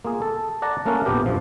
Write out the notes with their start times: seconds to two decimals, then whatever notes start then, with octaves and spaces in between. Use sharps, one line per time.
0.05 A#3 F4 G#4
0.22 A4
0.62 D5 F#5 A5 A#5
0.85 A3 A#3 C#4 A4 A#4 F#5
1.05 A#1 F2 A3 B3 G4 A#4
1.26 G2 F3